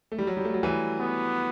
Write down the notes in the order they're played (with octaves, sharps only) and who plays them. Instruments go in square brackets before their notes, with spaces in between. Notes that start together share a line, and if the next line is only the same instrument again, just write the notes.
[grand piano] A3
G3
F#3
G3
A3
F#3
E3
[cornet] B3